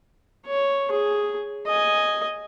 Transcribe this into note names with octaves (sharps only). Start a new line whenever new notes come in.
C#5
G#4
D#5 G#5